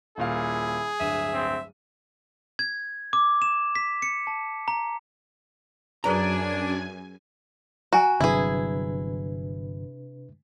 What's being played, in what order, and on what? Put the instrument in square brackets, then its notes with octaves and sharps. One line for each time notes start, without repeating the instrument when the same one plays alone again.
[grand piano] D#1 A#2 F5 [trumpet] E4 [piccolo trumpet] G#4
[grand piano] D1 G2 D#7 [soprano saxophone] E5
[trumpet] C4
[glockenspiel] G#6
D6
E7
B6
C#7
A5
A#5
[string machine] F#2 G#5 [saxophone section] D4 [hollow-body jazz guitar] G#4 B4 A#5
[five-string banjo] F#4 [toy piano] G#5 A#5
[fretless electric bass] G1 F#3 [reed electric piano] C3 D4 B4 [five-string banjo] E4 G#4